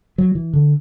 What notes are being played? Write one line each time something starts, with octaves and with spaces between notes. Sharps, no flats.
F#3
E3
D3